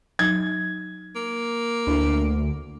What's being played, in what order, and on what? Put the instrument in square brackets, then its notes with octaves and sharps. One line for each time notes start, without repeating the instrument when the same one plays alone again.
[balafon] F#3 D#4 [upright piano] G#6
[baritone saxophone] A#3
[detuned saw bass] D2 [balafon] D4 E4